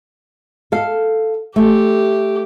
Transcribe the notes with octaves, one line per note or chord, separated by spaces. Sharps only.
A4 F5
A3 G4